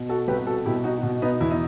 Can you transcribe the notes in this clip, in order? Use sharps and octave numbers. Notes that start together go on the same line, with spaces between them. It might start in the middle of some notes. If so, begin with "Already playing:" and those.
Already playing: B2
F#4 A4
C2 G4 B4
F#4 A4
B2 E4 G4
D#4 F#4
B2
B3 D#4
E2 E4
D#4